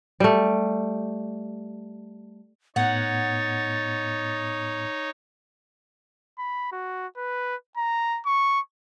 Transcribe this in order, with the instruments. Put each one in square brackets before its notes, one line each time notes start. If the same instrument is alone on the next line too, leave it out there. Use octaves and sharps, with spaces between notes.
[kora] G3 A3
[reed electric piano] A2 B3 G#6 [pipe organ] D#4 C#5 [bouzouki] F#5 [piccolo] A6
[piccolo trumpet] B5
F#4
B4
A#5
C#6